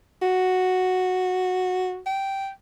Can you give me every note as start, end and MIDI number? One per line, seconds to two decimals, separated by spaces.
0.22 2.00 66
2.06 2.50 79